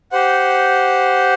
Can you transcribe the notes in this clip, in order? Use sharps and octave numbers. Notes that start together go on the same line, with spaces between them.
G4 C5 F#5